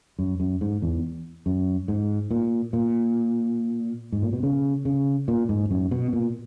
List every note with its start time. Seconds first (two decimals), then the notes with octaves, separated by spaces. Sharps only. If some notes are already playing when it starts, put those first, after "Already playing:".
0.19 F#2
0.40 F#2
0.61 G#2
0.82 E2
1.46 F#2
1.88 G#2
2.31 A#2
2.73 A#2
4.12 G#2
4.22 A#2
4.33 B2
4.43 C#3
4.85 C#3
5.28 A#2
5.49 G#2
5.71 F#2
5.91 B2
6.13 A#2